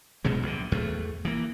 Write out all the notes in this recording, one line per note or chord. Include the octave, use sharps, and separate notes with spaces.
A#1 B2 F#3 G#3
A#1 D3
E2 A3
E3 A#3